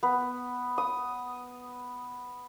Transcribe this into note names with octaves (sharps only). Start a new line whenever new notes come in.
B3
D#6